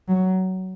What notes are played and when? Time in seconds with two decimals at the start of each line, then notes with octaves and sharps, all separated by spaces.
0.08 F#3